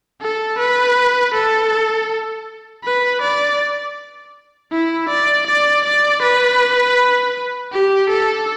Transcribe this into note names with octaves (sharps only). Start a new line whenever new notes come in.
A4
B4
A4
B4
D5
E4
D5
D5
D5
B4
G4
A4